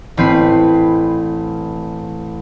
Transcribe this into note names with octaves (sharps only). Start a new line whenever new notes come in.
A1 C4 B4 C7